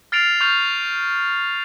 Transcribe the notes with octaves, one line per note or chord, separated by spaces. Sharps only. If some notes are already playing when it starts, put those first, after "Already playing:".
F6 A6 C7 D7 F7
C#6 F6 G6 F7